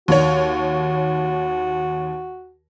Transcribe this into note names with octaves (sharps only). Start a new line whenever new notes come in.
D#2 F#4 C#5